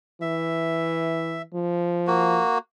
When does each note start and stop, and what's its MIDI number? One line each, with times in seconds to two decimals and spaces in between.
0.21 1.43 52
0.21 1.42 76
1.54 2.41 53
2.07 2.58 58
2.07 2.58 66